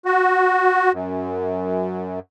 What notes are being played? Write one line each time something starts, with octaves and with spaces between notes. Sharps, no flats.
F#4
F#2